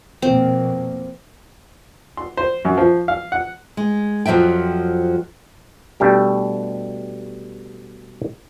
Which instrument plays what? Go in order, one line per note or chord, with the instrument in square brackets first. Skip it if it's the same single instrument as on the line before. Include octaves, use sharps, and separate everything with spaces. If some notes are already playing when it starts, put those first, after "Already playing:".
[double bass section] F2 B2 A#3 [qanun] C4
[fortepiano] C6
C5
F#2
F3
F5
F#5
[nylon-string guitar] G#3
F2 F3 F#3 E5 G5
[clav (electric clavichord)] B2 G3 A3 D4 G4